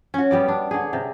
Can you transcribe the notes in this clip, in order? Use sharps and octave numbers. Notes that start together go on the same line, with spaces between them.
C#4 F#4
G3 B3 D5
D4
D3 G#4
C3